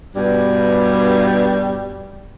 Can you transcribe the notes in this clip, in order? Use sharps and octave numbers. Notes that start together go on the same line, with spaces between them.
G2 B2 G3